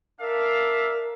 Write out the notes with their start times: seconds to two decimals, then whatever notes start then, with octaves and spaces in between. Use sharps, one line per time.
0.20 D4 A#4 E5 F5